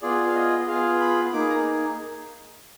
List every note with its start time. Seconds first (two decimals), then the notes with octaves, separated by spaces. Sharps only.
0.02 B3 F4 G#4 D5
0.27 F5
0.35 D#5
0.68 B3 F4 G#4 F5
1.00 B5
1.33 A#3 D#4 G#4 D6
1.49 A#5